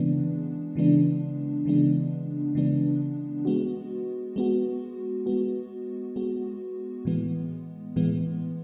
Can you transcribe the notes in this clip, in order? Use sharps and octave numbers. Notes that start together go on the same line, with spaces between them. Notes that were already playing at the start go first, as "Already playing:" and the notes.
Already playing: C#3 E3 G#3 B3 D4
C#3 E3 G#3 B3 D4
C#3 E3 G#3 B3 D4
C#3 E3 G#3 B3 D4
G#3 B3 F#4
G#3 B3 F#4
G#3 B3 F#4
G#3 B3 F#4
A2 E3 G#3 B3
A2 E3 G#3 B3